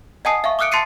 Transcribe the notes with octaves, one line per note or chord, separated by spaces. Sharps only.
D#5 F#5 G#5 A5 D#6 C7
E5 F5 C#6
D6 D#6 F6 F#6 C#7 D7
A5 C6 A6 C7 C#7 D#7